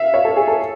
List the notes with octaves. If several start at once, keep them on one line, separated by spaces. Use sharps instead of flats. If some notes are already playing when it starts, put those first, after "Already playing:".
Already playing: E5 F5
C#5
A4
G#4
A4